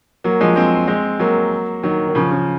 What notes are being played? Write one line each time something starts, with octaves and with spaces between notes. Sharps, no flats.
F#3 A#3
F3 G#3
G#3 C4
G#3 C4
F#3 A#3
D#3 F#3
D#3
C#3 F3
C#3